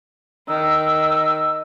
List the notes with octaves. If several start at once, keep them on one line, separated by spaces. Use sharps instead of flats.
D#3 E6